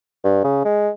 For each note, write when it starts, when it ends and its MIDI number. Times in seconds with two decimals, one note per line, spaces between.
0.24 0.41 43
0.44 0.60 49
0.65 0.90 56